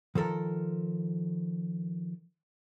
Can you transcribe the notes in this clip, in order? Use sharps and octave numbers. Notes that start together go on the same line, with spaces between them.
D#3 F3 A4 A#4